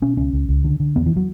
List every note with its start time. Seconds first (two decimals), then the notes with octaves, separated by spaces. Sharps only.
0.02 B2 C#4
0.17 C#2 C#4
0.33 C#2
0.49 C#2
0.64 D3
0.80 D3
0.96 E2 B3
1.06 E3
1.16 F#3